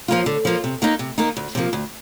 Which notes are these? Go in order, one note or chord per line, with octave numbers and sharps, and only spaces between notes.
F3 A#3 F4
D3
F3 A#3 F4
C3
D#3 A#3 D#4
C3
D#3 A#3 D#4
D2
C3 F3 A#3
D2